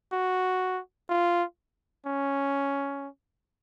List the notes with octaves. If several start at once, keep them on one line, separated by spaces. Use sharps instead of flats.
F#4
F4
C#4